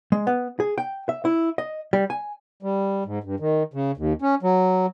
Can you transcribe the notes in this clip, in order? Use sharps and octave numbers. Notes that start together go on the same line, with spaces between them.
G#3
B3
G#4
G5
E5
E4
D#5
G3
G#5
G3
G#2
G2
D#3
C#3
D#2
C#4
F#3